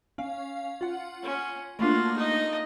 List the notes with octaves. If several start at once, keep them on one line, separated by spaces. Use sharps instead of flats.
C#4 F5
F4 F#5
C#4
A3 A#3 D4 F4 F#4
D#4 D#5